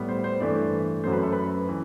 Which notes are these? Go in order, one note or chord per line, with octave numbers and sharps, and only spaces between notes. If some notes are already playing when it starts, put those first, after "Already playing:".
Already playing: A2 G3 B3
C5
C5
G2 E3 A3 D5
F#2 F#3 A3 C5
B4
A4
B4
E3